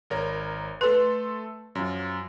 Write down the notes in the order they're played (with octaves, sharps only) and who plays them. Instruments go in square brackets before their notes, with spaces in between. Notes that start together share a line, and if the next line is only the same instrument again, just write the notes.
[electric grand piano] G#1 A#4 C#5
[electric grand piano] A3 A4 C6 [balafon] B4
[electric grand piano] F#2 F3